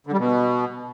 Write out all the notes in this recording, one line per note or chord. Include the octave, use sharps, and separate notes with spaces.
D3
G3
B2